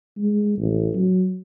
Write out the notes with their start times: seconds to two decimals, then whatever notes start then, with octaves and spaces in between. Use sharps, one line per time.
0.18 G#3
0.58 A1
0.95 F#3